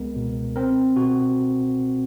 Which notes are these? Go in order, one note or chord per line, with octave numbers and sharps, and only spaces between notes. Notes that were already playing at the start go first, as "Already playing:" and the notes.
Already playing: C#2 G#3 B3 A#4
B2
C4 A#4
B2 F#4